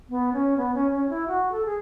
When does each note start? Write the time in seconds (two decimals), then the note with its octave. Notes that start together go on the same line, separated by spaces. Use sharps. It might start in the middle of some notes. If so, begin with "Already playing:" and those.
0.10 B3
0.33 C#4
0.57 B3
0.74 C#4
0.92 C#4
1.10 E4
1.28 F#4
1.51 A4
1.65 G#4